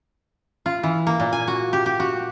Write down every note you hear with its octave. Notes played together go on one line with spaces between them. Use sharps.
F4
E3
A#3
A#2
G#5
F#4
G4
G4
F#4